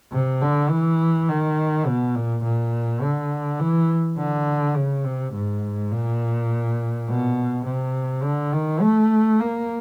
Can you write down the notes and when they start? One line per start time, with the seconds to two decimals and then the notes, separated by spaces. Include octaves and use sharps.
0.12 C3
0.41 D3
0.70 E3
1.28 D#3
1.87 B2
2.15 A#2
2.44 A#2
3.02 D3
3.59 E3
4.18 D3
4.75 C#3
5.05 C3
5.34 G#2
5.92 A#2
7.08 B2
7.66 C3
8.23 D3
8.53 D#3
8.81 A3
9.39 A#3